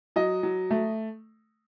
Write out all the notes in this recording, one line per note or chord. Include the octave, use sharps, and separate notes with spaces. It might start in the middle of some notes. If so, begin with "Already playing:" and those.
F#3 D#5
F#3
A3